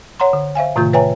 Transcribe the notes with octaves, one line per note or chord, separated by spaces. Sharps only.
C#5 F#5 A#5 C6
D3
C5 E5 F5 G#5
A2 C3 D#3 A3 F4 G6
B4 C#5 E5 G5 G#5 A#5